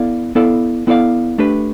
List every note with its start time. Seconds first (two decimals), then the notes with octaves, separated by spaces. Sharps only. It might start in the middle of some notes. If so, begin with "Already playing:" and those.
Already playing: B3 E4 A4 D5 F5
0.35 B3 E4 A4 D5 F5
0.87 B3 E4 A4 D5 F5
1.38 A3 D4 G4 B4